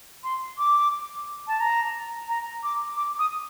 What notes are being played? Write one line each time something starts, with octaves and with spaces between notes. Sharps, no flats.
C6
D6
A5
A#5
A#5
D6
D6
D#6